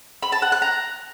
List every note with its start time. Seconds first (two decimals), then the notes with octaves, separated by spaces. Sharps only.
0.23 B5
0.32 A5
0.42 F#5
0.52 F#6
0.62 A#5